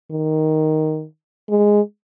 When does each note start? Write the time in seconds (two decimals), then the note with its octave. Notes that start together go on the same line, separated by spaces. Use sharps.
0.11 D#3
1.50 G#3